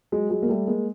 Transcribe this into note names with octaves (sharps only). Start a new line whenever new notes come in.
F#3 G#3
F#3 G#3
A#3
G3 A3
G#3 A#3